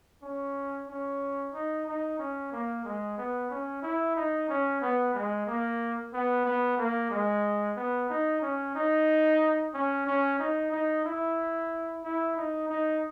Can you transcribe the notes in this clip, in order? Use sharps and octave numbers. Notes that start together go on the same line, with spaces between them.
C#4
C#4
D#4
D#4
C#4
A#3
G#3
B3
C#4
E4
D#4
C#4
B3
G#3
A#3
B3
B3
A#3
G#3
B3
D#4
C#4
D#4
C#4
C#4
D#4
D#4
E4
E4
D#4
D#4